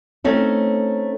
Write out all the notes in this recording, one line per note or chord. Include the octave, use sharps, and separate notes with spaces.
A3 C4 C#4 D#4